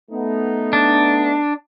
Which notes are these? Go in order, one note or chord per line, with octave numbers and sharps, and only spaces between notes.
A3 B3 D#4
D4